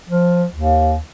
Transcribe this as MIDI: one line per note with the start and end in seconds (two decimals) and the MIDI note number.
0.09 0.44 53
0.55 0.96 39